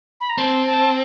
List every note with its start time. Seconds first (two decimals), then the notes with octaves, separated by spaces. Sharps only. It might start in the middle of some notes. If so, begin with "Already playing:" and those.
0.21 B5
0.30 A#5
0.38 C4 A5
0.66 A5